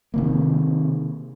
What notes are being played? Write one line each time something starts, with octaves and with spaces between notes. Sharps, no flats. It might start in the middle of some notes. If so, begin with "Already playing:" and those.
C3 D#3 A#3